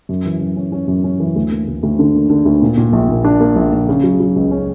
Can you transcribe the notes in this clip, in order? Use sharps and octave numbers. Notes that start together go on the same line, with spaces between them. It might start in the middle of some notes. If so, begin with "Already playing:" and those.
F#2
E3
F#2
C#4
C#4
F#2
C#4
E3
D2
A#3
D2
D2
D3
A#3
D3
D2
A#2
A#2
A#1
A#2
D4
A#3
A#1
A#1
C#3
F#3
F#3
C#2
C#4